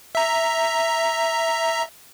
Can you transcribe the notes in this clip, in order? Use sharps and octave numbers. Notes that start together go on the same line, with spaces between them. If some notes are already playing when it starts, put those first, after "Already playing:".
E5 A#5